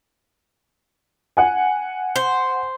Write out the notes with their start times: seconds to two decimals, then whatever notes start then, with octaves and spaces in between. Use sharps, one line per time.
1.37 F#5 G#5
2.16 C5